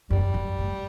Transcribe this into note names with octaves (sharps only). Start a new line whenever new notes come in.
F#2 G3
F#2
A2